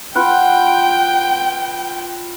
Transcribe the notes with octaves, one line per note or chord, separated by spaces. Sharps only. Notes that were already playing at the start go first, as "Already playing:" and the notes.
F4 B4 F#5 G5